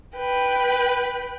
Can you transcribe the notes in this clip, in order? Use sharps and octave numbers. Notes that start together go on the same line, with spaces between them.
B4 G5